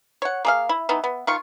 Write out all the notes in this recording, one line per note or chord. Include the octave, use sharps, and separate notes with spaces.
C#5 F#5
A#3 G#4 F5
E4
E3 B3 D#4
B3
D#3 F4 C#6